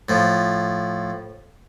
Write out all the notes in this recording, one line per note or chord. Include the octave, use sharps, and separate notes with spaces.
A2 F3